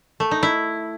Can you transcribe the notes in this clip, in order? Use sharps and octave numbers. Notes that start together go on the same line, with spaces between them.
A3
D#4
E4